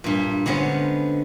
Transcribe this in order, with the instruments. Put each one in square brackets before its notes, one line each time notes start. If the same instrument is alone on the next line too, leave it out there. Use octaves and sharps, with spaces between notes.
[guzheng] G2 A#2
D3 G#3 B3 C#4 C5